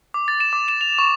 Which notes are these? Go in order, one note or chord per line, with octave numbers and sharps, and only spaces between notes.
D6
A6
E7
D6
E7
F7
C#6